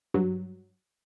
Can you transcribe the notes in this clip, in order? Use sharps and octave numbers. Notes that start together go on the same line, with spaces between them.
G2 F#3